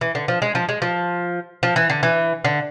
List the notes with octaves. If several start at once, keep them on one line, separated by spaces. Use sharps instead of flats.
E3
D3
F3
G#3
F3
G#3
F3
F3
E3
D3
E3
D3